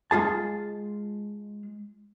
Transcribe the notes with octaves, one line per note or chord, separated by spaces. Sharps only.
G#3 F4 G#4 A5